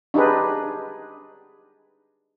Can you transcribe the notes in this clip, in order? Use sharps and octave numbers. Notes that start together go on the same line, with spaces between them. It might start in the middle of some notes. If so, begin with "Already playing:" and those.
D4 D#4 G4 G#4 B4